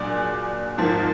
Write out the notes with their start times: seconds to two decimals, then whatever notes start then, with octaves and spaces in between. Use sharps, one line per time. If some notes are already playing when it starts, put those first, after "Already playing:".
Already playing: A#2 F#3 D4 G#4 D5
0.78 G#2 F3 A#3